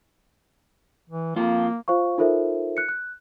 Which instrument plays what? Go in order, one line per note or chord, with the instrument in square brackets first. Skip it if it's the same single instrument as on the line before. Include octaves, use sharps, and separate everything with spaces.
[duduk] E3
[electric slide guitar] F2 F4 [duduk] A#3
[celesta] F4 C5 F5 C#6
D#4 F4 A4 A#4 C5 E5
F#6 C#7
F#6